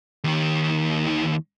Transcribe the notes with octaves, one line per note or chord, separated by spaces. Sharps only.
D#2 D#3